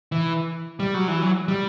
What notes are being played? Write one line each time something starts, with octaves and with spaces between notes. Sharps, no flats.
E3
G3
F#3
E3
F#3
G3